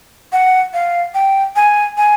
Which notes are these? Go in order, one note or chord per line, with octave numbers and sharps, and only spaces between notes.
F#5
F5
G5
G#5
G#5